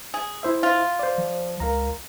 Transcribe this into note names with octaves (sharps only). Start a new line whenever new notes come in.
G#4
E4 C5 E5
F4
C5 D5
F3
C#2 A#4 F5 A#5